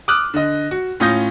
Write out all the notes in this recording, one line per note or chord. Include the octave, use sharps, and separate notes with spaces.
D6 D#6 F6 F#6
D3 D#5
F#4
A2 C#4 F4 D#6 G6 A#6